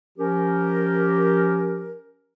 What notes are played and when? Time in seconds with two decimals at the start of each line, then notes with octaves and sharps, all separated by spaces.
0.18 F3 C#4 G4 A#4